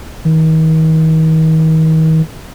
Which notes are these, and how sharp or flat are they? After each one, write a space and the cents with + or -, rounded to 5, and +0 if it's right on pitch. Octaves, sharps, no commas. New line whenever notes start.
D#3 +40